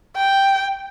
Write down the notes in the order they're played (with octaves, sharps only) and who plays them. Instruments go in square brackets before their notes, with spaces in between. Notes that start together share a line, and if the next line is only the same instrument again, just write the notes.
[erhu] G5